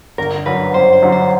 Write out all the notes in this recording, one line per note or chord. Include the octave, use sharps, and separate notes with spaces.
G1 A#4
F#2 D3 B4
G1 C5
C5
F#2 D3
C5